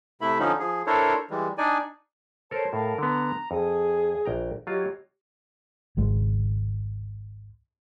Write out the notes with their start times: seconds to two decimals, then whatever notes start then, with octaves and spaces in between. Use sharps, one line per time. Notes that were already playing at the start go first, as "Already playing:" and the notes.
0.21 C3 A3 E4 E5 B5
0.39 D3 F3 C#4 D#4
0.59 F3 G#4
0.87 D4 E4 A4 A#4 C5 C#5
1.30 E3 G3 G#3
1.58 D4 D#4 D5 G#5
2.51 A4 A#4 C5 C#5 A5
2.73 A2 A4 A#4 F5
2.98 D3 B3 A#5
3.51 F2 G#4 D#6
4.25 A#1 G5 A#5
4.67 F#3 F4 G4 C#5 D#5
5.97 G#1 C#2 G#3